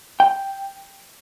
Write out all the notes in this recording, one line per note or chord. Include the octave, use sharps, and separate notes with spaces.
G5